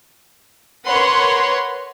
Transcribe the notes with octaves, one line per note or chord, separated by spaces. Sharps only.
A#4 B4 C#5 F#5 C6